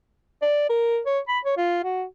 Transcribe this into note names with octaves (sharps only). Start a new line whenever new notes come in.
D5
A#4
C#5
B5
C#5
F4
F#4